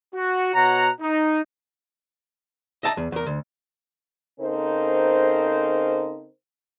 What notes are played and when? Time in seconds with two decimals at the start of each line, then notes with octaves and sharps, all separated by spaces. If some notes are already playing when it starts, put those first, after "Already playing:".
0.14 F#4
0.54 B2 F#4 C#5 F#5 A#5
1.01 D#4
2.83 D#5 E5 A5 A#5
2.97 E2
3.12 E2 A#4
3.26 D2
4.40 C#3 C4 D#4 A4 A#4 C5